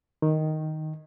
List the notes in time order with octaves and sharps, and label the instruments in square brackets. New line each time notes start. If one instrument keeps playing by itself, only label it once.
[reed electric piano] D#3